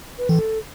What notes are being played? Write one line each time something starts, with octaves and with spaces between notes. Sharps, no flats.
B4
E3 A4